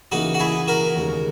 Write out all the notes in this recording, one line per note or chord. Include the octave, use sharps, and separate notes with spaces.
C#3 E3 A#3 D#4 F#4
F#4
E4 G#4
F#4 A#4
D#2 C#3 G#3